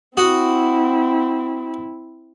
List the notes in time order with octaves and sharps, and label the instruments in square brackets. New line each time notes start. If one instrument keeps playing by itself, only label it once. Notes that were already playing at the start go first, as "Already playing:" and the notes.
[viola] C4 E4 [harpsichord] F#4 D#6